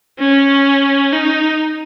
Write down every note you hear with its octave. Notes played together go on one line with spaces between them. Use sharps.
C#4
D#4